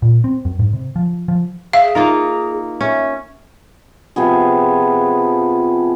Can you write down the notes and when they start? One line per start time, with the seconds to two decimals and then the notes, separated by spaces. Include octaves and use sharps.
0.02 A#2
0.24 C4
0.45 F#2
0.59 G#2
0.73 C3
0.96 F3
1.28 F3
1.73 G#4 E5 F5
1.95 A#3 D#4 F4 A#4
2.81 C#4 E5
4.16 C3 F3 B3 G#4